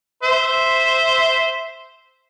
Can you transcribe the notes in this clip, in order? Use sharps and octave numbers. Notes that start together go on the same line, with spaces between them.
C5 E5